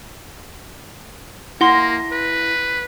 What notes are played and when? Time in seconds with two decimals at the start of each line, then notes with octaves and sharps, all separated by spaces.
1.61 A#3 E4 F#5 C6 A#6
2.12 B4